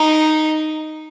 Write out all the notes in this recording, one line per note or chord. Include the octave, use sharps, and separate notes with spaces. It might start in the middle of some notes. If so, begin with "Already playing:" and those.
Already playing: D#4